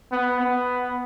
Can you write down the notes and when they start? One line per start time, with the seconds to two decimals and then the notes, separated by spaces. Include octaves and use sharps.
0.12 B3
0.40 B3